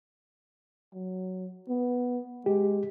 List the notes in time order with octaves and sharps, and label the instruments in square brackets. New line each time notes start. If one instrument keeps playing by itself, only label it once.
[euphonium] F#3
B3
[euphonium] G#3 [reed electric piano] G4